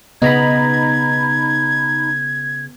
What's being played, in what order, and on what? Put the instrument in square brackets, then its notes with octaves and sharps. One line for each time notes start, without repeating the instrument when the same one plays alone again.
[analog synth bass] C#3 [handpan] B3 [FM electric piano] D#4 A#5 B5 [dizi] G#6